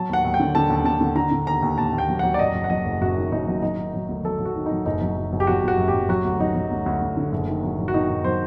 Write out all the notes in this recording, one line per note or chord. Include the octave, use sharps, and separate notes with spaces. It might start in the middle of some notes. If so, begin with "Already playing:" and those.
Already playing: F#3 A5
D#2 F#5
D#2
G5
D3
D3 A5
D#2
D3 A5
D3
D3 A#5
D3
D#2 A#5
D#2
D#2 A5
D#2
G5
F#3
F#3 F#5
D5
F#2 D#5
F#1
F#5
F#3 D#5
F#1
F#2 F#4
D#3
F#1 D#4
F#3
F#3 D#4
D#3
F#3
D2
F#3 A4
F#3
F#4
D#3
D#4
F#3
F#1 D#4
F#3
F#1
F#1
G4
F#3 F#4
F#1 F#4
F#2
G4
F#2
F#3 F#4
D2
F#3 D#4
F#3
D2
D2
D2
D3
F#1
D#3
F#3
F#3
F#4
D#3 D#4
F#1
F#3 C5